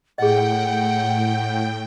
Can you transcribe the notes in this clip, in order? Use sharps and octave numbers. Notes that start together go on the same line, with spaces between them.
A2 G#4 D#5 F#5 G5